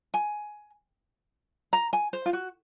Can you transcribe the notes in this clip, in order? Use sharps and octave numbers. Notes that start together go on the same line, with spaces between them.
G#5
A#5
G#5
C5
F4
F#4